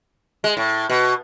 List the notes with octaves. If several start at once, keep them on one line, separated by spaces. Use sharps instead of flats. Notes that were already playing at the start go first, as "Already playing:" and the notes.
G#3
A2
B2